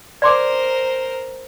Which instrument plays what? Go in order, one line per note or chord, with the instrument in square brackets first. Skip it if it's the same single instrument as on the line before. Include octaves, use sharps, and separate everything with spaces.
[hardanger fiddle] A#4 C5 [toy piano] D5 C6 D6